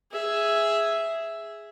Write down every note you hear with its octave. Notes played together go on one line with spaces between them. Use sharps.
G#4 E5